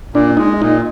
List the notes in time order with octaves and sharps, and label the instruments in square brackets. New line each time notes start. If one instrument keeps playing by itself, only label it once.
[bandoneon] A#2 [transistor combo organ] D4
[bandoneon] G#3 [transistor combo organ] D#4
[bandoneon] A#2 [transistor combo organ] D#4